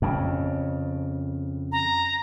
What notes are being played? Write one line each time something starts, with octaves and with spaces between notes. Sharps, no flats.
F2 C#3
A#5